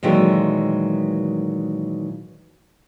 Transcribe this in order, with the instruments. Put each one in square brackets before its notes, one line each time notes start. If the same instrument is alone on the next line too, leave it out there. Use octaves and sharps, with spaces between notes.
[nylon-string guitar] A#2 D#3 E3 F#3 G#3 A3